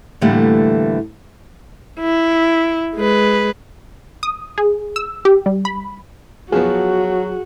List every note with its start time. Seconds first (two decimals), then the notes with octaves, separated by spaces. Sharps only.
0.21 A2 D3 E3 G3 A3 A#3
2.00 E4
2.96 G#3 B4
4.23 D#6
4.58 G#4
4.96 E6
5.25 G4
5.46 G3
5.65 B5
6.52 F3 F#3 B3 F#4 G#4